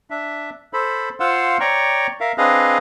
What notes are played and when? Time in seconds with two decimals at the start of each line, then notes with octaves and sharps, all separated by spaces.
0.10 D4 E5
0.73 A4 C5 B5
1.20 F4 C5 F5 F#5 C6 E6
1.60 C#5 D5 G5 A#5 C#6
2.20 A#4 E5 F5
2.38 C4 D4 G#4 B4 D#5 F5